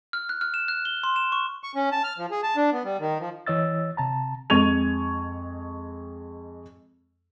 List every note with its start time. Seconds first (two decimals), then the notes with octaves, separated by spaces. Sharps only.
0.13 F6
0.29 F#6
0.41 F6
0.54 E7
0.68 F#6
0.85 G7
1.04 C6
1.16 E7
1.32 C#6
1.64 C#6
1.75 C#4
1.92 A5
2.04 F6
2.18 F3
2.31 G#4
2.43 A5
2.56 D4
2.72 B3
2.84 G3
3.00 D#3
3.19 F3
3.47 E3 C#5 D#5 E6 A6
3.97 C3 A5 A#5
4.50 F2 G#3 C#6 G#6 D#7 F7